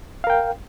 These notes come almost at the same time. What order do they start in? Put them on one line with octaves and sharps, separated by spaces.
F5 A#4 G5